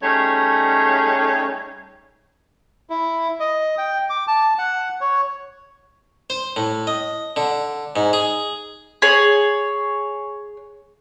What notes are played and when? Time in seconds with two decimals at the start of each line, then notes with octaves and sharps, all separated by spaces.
0.02 G3 A3 C#4 D#4 G#4 C#5
2.90 E4
3.40 D#5
3.78 G5
4.10 D6
4.28 A5
4.59 F#5
5.01 C#5
6.30 C5
6.56 A2
6.87 D#5
7.36 D3
7.96 G#2
8.13 G#4
9.02 G#4 C#5